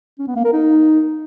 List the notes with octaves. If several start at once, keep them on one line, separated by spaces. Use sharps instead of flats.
C#4
B3
A#3
A#4
D#4